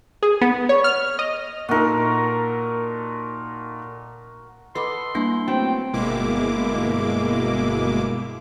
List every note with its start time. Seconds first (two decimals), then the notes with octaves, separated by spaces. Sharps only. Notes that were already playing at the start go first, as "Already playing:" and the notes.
0.23 G#4
0.41 B3
0.69 C#5
0.84 F6
1.19 D#5
1.69 A#2 D#4 F#4 A4 A#4
4.75 A4 B4 D#5 F#5 B5 C6 D6
5.15 G3 A#3 D4 E4 F#5
5.48 F#3 A3 B3 C4 G5 A5
5.93 G1 B2 G#3 A#3 E4 D6